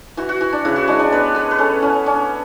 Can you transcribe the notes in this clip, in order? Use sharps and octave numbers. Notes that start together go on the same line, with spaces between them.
E3 F#4
F#4
E3
D4
C#3 E4
F#4
G#3 D4
D4
B3 B4
B3 B4
B4
C#4 A4
C#4 E4
C#4 D4